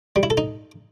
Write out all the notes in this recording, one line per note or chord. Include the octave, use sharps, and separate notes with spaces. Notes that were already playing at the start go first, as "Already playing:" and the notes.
G3
E4
A4
D#4